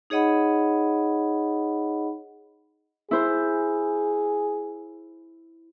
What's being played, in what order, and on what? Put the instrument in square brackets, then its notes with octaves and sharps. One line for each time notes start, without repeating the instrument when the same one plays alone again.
[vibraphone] D#4 G#4 C#5 D#5 F#5 B5
[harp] E4 C5 [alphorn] G#4